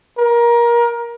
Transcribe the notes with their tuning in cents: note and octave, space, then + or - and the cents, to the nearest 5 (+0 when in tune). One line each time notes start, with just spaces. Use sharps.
A#4 +25